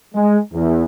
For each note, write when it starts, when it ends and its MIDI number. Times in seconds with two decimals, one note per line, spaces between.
0.15 0.39 56
0.53 0.84 40